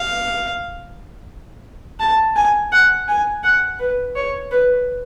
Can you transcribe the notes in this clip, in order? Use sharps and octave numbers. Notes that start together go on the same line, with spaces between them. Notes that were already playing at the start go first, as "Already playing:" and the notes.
Already playing: F5
A5
G#5
F#5
G#5
F#5
B4
C#5
B4